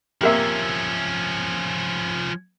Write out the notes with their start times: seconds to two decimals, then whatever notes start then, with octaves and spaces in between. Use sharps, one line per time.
0.21 C3 F3 A#3 C#4 E5